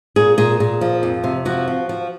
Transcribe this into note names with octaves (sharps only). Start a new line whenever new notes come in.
A#2 G#4
A#2 G#4
A#2 G#4
F3
F2
C3
F3 F#4
F3
F3